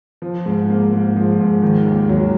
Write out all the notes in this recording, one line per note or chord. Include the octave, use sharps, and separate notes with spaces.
F3
G#2
A#3
G#2
F3
G#2
D#3
D#2
F#3